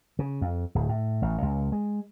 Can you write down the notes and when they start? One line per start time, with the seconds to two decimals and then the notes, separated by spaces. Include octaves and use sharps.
0.19 C#3
0.41 F2
0.75 D1
0.89 A2
1.22 A1
1.42 C#2
1.72 G#3